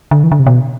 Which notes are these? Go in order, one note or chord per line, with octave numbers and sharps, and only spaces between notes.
D3
E3
D3
C3
B2